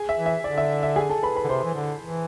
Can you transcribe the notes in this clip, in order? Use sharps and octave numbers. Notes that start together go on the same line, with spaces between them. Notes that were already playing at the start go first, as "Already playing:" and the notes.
Already playing: G#4 G#5
E5
E3
E5
D3 D5
E5
E5
G#4 G#5
A4 A5
B4 B5
B4 B5
D3
C3 C5 C6
E3
D3
E3